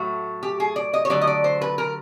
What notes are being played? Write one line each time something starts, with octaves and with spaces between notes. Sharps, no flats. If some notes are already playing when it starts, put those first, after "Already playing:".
Already playing: A2 F#3 A3 F#4
G4
G#4
D5
D#5
C#5
D3 F#3 A3 D5
D#5
D5
C5
B4
A#4